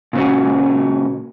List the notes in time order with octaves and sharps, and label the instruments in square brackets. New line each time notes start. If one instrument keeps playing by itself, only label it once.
[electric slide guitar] A#2 C#3 F#4